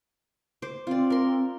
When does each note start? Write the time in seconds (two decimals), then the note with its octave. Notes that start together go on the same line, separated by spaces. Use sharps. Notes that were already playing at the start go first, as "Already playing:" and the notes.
0.62 C5 D6
0.87 C4 F4 D5
1.10 A#4 C6